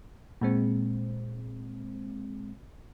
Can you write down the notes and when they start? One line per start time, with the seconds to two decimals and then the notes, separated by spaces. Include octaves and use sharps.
0.41 A#2 G#3 C4